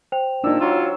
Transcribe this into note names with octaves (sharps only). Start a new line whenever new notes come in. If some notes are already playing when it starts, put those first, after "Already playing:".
C5 G5 F7
A#2 D4 D#4 E6
F#3 F4 E6